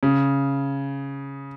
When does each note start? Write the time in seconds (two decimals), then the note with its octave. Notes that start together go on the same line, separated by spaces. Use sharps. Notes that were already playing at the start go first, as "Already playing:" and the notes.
0.03 C#3